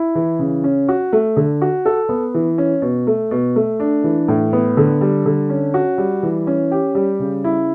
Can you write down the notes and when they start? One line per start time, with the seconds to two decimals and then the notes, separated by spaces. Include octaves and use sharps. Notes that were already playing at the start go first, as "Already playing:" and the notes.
Already playing: E4
0.15 E3
0.39 C#3
0.64 C#4
0.89 F#4
1.13 A3
1.36 D3
1.62 F#4
1.86 A4
2.09 B3
2.34 E3
2.58 C#4
2.82 B2
3.07 A3
3.31 B2
3.56 A3
3.80 D4
4.04 E3
4.28 A2
4.53 B3
4.77 D3
5.01 G3
5.26 D3
5.50 C#4
5.74 F#4
5.98 G3
6.23 E3
6.47 C#4
6.71 G4
6.95 G3
7.19 C#3
7.44 E4